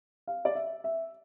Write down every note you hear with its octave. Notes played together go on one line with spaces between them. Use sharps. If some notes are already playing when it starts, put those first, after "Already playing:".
F5
D5
E5
E5